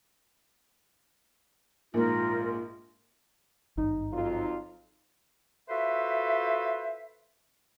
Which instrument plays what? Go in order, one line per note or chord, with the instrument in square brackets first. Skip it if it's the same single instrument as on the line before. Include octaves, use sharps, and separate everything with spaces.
[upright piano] A#1 G#2 [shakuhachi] F4 [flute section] A#4
[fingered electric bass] G#1 G2 D#3 [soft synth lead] D#4
[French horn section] F2 F#3 F4
[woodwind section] F4 F#4 A4 B4 C5 E5